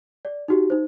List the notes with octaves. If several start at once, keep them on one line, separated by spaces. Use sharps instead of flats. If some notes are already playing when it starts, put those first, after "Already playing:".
D5
D#4 F#4 G4
D#4 C5